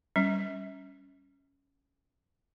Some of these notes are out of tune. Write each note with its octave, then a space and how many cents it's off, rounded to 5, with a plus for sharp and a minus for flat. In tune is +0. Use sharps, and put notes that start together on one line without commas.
G3 +0 C#4 +0